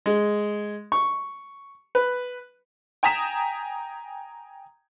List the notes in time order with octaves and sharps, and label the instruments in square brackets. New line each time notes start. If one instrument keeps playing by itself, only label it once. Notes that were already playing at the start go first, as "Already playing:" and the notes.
[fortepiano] G#3
C#6
B4
[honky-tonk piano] G5 G#5 A#5 D#6 B6 E7